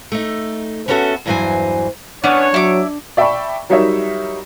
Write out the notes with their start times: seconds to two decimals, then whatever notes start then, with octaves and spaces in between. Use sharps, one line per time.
0.12 A3 D#4
0.88 B3 C#4 E4 F#4 A4 E5
1.26 E2 G2 E3 F#3 C5 G#5
2.24 B3 C#4 D4 C#5
2.54 F#3 E4 D6
3.17 D5 E5 G5 A5 B5 C#6
3.70 F#3 G3 D#4 A#4 C#5 E5